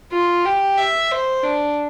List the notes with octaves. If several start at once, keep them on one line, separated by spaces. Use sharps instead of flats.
F4
G4
E5
C5
D4